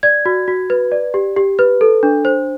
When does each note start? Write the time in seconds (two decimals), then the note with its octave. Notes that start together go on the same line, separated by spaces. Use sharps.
0.03 D5 G#6
0.26 F#4
0.48 F#4
0.70 B4
0.92 D5
1.14 G4
1.37 G4
1.59 B4
1.81 A4
2.03 D4
2.25 C5